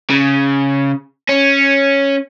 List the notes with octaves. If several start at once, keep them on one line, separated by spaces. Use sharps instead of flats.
C#3
C#4